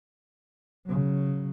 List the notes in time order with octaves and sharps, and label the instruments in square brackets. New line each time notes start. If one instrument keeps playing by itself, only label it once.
[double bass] C#3 F#3